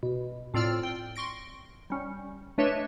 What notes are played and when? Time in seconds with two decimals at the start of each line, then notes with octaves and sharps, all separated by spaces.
0.03 B2
0.54 A2 C4 F4 D5 E6 F6
0.83 G5
1.16 C6 C#6 A#6 D7
1.90 G3 C#4
2.58 A3 D4 B4 C#5 D#5 E5